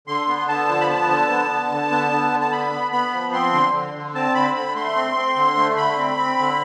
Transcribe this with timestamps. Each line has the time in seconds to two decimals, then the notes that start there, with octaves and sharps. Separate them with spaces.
0.07 D3 C6
0.28 B3
0.48 D3 A5
0.69 F3
0.81 B5
0.89 B3 A5
1.09 D3
1.30 B3
1.51 D3
1.71 D3
1.91 B3
2.11 D3
2.32 D3
2.41 A5
2.51 B3 B5
2.73 B3
2.92 B3 B5
3.13 F3
3.33 C4 C6
3.53 D3
3.73 D3
3.94 D3
4.15 C4 A5
4.34 D3 B5
4.55 D3 B5
4.75 A3 C6
4.96 C4
5.16 C4
5.36 D3
5.57 A3
5.77 D3 B5
5.97 C4
6.17 C4
6.39 D3